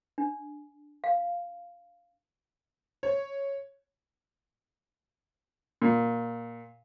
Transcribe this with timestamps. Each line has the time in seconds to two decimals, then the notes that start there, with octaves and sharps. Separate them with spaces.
0.18 D4
1.04 F5
3.03 C#5
5.82 A#2